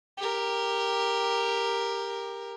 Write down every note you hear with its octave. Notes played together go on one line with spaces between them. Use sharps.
G4 A#4